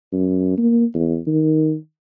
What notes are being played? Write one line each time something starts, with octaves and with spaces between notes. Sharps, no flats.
F#2
A#3
E2
D#3